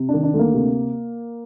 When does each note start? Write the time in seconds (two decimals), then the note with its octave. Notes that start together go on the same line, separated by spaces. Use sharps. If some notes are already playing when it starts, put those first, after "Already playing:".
Already playing: C3
0.09 D#3 D4
0.24 D4
0.34 D2
0.39 A#3
0.54 C3